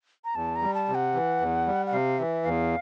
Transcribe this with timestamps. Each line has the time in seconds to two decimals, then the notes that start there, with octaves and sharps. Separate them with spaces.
0.25 A#5
0.35 E2 A5
0.56 A#5
0.62 G3
0.75 A5
0.88 C3
0.95 F#5
1.14 E3
1.41 E2
1.67 G3
1.87 F#5
1.93 C3 F5
2.19 E3 E5
2.45 E2 F5